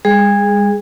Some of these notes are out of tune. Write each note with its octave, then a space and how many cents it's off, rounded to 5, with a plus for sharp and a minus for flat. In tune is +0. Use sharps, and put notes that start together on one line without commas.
G#3 -45 G#4 +0